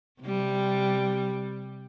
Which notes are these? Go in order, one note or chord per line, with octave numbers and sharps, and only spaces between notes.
C3 G3